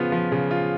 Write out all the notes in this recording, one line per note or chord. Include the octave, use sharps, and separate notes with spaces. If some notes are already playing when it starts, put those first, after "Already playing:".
Already playing: C#3 F3 B3 F4
F3
C#3
F4